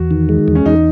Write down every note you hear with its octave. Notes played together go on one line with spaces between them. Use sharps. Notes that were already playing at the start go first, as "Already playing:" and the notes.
Already playing: E2 F#4
D#3
G#3
E2
C#4
E2 D#4